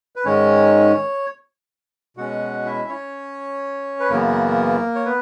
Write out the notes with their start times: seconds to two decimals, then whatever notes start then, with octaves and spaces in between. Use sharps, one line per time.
0.16 B4
0.25 G#2 D#3 G#3 C#4 C#5
2.17 B2 G#3 C#4 F#4 F#5
2.65 E4 E5
2.89 C#4 C#5
4.00 B4
4.09 F#2 C#3 E3 A#3 B3 A#4
4.95 C#5
5.05 B3 B4